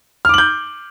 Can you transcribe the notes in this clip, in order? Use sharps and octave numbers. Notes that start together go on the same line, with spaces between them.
D6 F6 G6 F#7